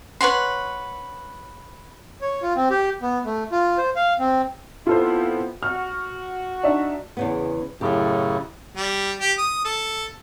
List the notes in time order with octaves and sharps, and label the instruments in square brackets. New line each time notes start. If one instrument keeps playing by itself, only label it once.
[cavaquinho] B4 C#5 F#5 C6
[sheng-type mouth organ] C#5
F4
C4
G4
B3
A3
F4
C5
F5
C4
[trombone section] B3 C4 E4 [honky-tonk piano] F4 A4 C5
[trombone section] F#4 [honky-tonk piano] F6
[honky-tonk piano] D4 D#4 E5
[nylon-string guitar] E2 C#3 B3
[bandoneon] F#2 A2 C#3 [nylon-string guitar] E4 G4
[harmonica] G3
G4
D#6
A4